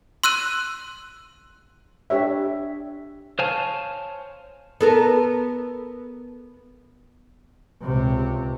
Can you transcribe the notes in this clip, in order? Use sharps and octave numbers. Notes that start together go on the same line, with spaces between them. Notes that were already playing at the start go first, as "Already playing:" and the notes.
C6 E6 F#6 D#7
D4 G4 C#5 E5
C5 C#5 F5 G#5 A5
B3 A4 A#4
C#2 C3